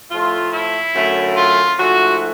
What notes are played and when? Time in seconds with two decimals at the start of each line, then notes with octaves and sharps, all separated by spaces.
0.11 A2 F3 A3 F4
0.53 E4
0.94 F#2 D3 F#3 A3
1.36 F4
1.78 G#2 F3 A3 F#4